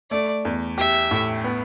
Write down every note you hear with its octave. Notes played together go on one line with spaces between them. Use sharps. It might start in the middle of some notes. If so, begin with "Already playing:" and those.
A3 D5
E2
G4 E5
A2
B3